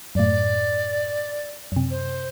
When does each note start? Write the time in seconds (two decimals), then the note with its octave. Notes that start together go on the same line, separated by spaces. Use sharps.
0.15 F#2 A2 D5
1.72 F#2 C3
1.91 C5